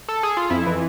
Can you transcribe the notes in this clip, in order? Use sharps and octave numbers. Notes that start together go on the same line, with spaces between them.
A4
G#4
F4
F2 E4
E3